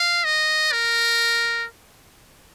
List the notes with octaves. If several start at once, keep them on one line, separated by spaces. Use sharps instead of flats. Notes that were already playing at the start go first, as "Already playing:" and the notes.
Already playing: F5
D#5
A#4